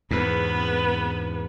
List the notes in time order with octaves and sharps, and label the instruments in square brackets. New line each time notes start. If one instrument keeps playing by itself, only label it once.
[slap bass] E2 G#2 [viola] B3 B4